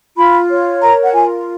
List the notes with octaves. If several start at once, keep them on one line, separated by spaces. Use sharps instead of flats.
F4 B5
C#5
A#4 A#5
F#5
F4 G#5